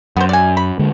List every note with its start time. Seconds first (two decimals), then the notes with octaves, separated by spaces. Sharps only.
0.17 F#2 B3 C5
0.29 D5 G#5
0.57 B5
0.79 D3 G#3